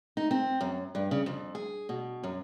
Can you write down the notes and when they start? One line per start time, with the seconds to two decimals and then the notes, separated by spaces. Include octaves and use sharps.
0.17 D#4
0.31 C4
0.61 F#2
0.95 G2
1.11 C#3
1.26 F2
1.55 G#4
1.89 B2
2.23 F#2